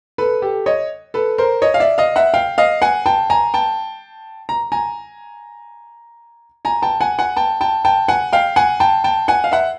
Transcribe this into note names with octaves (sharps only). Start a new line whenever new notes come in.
A4 B4
G4 A4
C#5 D#5
A4 B4
A#4 C5
C#5 D#5
F5
D5 E5
D#5 F5
E5 F#5
F5 G5
D#5 F5
F#5 G#5
G5 A5
G#5 A#5
G5 A5
A#5
G#5 A#5
G#5 A#5
G5 A5
F#5 G#5
F#5 G#5
G5 A5
G5 A5
G5 A5
F#5 G#5
F5 G5
F#5 G#5
G5 A5
G5 A5
F#5 G#5
F5
E5 F#5